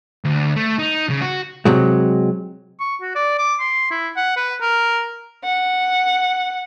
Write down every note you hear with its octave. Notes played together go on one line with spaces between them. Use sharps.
D2
A3
D#4
C#3
F#4
C3 F#3 G#3
C#6
F#4
D5
D6
C6
E4
F#5
B4
A#4
F#5